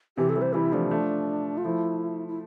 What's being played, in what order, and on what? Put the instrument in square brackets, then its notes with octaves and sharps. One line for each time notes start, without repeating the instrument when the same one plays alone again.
[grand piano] C3 E3 [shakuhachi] G4
[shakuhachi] A4
[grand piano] E3 G3
[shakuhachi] C5
[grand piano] E3 G3 [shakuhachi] E4
[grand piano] F3 A3 [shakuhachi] D4
[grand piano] F3 A3
[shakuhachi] F4
[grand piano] F3 A3 [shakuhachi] E4
[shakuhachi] E4